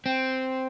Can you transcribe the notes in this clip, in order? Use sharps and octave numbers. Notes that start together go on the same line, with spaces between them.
C4